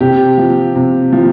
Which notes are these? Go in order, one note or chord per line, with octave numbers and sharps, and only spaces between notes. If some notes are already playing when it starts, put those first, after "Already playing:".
C3 G4
F3
C3
F3